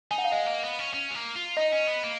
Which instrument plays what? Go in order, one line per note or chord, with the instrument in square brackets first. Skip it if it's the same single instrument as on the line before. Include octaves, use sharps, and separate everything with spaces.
[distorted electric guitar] D#4 [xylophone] G#5
[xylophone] F#5
F5
[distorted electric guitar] G#3 [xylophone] D#5
[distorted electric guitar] A#3
B3
C#4
C#4
G#3
A#3
F4
[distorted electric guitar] D#4 [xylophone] D#5
[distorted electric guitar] C#4
B3
A#3